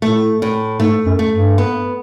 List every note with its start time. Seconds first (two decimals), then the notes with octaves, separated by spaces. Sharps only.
0.02 A2 A3
0.42 A2
0.80 G#2 A3
1.06 F#2
1.19 A3
1.31 G2
1.58 B3